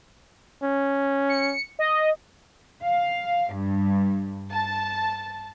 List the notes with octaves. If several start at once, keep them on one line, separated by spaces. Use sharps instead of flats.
C#4
C#7
D#5
F5
G2
A5